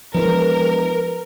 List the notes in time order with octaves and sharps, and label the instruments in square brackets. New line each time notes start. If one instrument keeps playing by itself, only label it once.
[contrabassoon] E1 [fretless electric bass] F3 [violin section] A#4 [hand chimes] B4